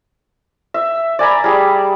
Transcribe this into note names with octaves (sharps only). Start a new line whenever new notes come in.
E5
D5 G#5 A#5 B5
G3 G#4